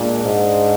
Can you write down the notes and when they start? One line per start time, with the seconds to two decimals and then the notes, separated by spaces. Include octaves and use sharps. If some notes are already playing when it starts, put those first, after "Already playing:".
Already playing: A#2 G#3 D4
0.24 G#2